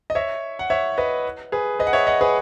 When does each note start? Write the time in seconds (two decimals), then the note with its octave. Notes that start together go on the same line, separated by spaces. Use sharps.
0.10 D#5
0.15 C#5 E5
0.59 F#5
0.70 C#5 E5
0.98 B4 D#5
1.52 G#4 B4
1.79 B4 D#5
1.87 F#5
1.93 C#5 E5
2.07 D#5 F#5
2.21 G#4 B4